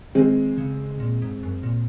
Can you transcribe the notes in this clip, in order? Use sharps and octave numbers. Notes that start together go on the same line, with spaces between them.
D#3 G#3 C4
C#3
A#2
G#2
F#2
A#2